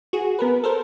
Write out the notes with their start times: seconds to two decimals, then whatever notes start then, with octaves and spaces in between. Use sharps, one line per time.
0.13 F#4 G#4
0.39 B3 A#4 B4
0.64 A4 A#4 C5